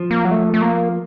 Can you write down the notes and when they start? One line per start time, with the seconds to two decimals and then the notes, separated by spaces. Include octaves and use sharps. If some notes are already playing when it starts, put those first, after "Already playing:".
Already playing: F3
0.11 A#3
0.25 F#3
0.31 A3
0.54 A3
0.61 A#3